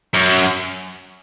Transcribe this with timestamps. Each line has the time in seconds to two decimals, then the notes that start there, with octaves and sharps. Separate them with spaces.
0.14 F#2